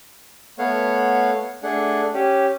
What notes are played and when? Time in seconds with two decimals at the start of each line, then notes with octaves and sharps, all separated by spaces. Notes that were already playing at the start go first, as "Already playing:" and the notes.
0.59 A3 B3 C#5 F5 F#5
1.63 A3 D4 G#4 F#5
2.14 C#4 G4